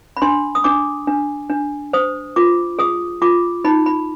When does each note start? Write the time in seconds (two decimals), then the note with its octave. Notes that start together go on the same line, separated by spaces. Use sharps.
0.17 B5
0.22 D4 C6
0.55 D#6
0.64 D4 D6
1.07 D4
1.50 D4
1.93 C5 D#6
2.36 F4 D6
2.79 G#4 D#6
3.21 F4 D6
3.64 D#4 B5
3.86 B5